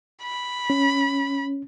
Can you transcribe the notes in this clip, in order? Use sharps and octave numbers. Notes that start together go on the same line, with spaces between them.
B5
C#4